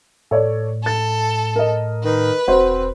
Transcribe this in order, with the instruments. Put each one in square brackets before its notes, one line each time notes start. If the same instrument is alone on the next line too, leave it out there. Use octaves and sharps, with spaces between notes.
[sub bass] A2 [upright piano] A4 C#5 D5
[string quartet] A4 [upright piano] A6
[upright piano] A#4 D#5
[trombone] D#3 [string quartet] B4
[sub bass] E1 [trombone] C4 [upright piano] F#4 C5